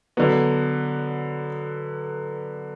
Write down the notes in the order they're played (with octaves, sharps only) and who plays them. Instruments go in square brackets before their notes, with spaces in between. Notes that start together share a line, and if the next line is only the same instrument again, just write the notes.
[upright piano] D3 F#3 B3